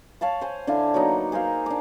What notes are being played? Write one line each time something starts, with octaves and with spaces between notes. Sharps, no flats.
C#5 F5 A5 B5
C5 G#5
D3 D4 E4 F5
F#3 A#3 B3 D#4
G#4 A#4 C5 F5
D4 D6